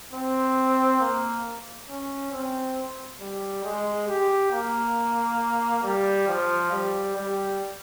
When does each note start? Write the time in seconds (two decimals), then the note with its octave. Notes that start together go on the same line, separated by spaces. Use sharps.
0.13 C4
1.00 A#3
1.89 C#4
2.32 C4
3.21 G3
3.64 G#3
4.08 G4
4.52 A#3
5.83 G3
6.28 F3
6.72 G3
7.16 G3